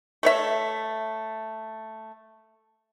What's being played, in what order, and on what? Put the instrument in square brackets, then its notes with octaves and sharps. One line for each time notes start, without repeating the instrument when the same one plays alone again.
[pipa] A3 C#5 E5